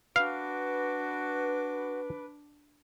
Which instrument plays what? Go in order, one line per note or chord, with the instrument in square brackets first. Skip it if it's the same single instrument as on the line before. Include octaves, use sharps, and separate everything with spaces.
[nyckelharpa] D4 D6 [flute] F#4 [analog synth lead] B4 [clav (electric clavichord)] F5